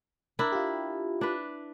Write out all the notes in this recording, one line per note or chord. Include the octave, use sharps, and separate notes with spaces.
D4 E4 A#4
F4 G4
D4 B4